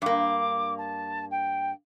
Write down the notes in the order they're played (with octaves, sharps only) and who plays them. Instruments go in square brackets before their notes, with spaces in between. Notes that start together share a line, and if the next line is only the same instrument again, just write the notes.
[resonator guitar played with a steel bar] G2 A#3 [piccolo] D6
[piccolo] A5
G5